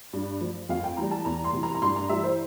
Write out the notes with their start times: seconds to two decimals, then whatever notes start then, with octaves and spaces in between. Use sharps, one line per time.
0.13 G2
0.41 F3
0.69 F2 F5
0.84 G5
0.97 E3 G3 A#5
1.11 A5
1.25 E2 A#5
1.44 C6
1.53 C3 E3
1.63 A#5
1.75 A#5
1.82 G2 C6
1.96 A#5
2.09 E3 G3 E5
2.23 C5